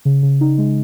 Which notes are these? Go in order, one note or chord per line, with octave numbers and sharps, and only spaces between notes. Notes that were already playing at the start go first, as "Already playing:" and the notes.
C#3
C#3
D#4
G#3